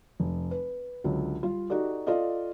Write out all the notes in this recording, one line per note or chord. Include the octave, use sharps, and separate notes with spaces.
F1
B4
C#2 D3 F#3
G3 F4
D#4 F#4 G4 A4 D5
F4 A4 D5 D#5 F5